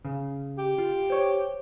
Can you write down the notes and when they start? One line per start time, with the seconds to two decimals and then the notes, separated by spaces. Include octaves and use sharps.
0.05 C#3
0.58 G4
0.78 F4
1.10 C5 C#5